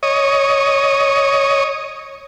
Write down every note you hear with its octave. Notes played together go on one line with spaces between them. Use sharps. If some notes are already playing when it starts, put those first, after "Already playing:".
C#5 D#5